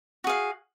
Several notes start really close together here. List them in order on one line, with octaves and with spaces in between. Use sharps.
F#4 G#4 F5